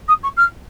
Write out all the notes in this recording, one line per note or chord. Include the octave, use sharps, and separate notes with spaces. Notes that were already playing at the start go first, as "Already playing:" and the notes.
D#6
C#6
F6